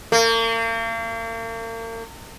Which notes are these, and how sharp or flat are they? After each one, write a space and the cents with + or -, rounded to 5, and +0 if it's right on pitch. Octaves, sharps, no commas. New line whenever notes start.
A#3 -40